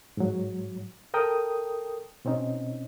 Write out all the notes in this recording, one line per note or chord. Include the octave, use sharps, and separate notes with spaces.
G#2 F#3
A4 A#4 G5 D#6
B2 C4 C#4 D#4